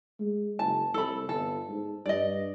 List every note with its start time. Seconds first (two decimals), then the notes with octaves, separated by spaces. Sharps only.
0.20 G#3
0.59 F#1 A5
0.94 C2 A4 B5
1.29 G1 A4
1.69 G#2
2.06 G2 D5 D#5